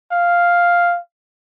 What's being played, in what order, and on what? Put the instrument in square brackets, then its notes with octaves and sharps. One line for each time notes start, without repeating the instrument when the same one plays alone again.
[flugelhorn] F5